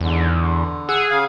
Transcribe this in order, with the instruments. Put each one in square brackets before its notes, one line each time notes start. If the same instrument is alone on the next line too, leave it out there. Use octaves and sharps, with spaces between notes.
[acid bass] E2 [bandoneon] G#2 D3
[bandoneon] D3
[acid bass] G#4 [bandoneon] F#5 E6
[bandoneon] C#3 F5